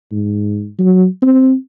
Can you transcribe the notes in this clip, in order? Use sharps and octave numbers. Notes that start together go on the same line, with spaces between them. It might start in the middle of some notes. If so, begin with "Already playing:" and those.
G#2
F#3
C4